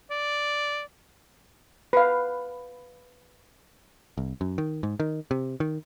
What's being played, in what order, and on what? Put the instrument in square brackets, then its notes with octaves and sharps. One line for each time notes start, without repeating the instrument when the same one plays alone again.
[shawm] D5
[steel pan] B4 F5
[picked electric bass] C2
F#2
D#3
G#2
D#3
C3
D#3